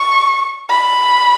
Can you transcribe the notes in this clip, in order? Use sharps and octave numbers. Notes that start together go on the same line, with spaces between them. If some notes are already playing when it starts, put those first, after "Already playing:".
Already playing: C#6
B5